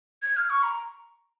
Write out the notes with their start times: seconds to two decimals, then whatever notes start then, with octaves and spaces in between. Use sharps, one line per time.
0.22 G#6
0.36 F6
0.50 C#6
0.63 A#5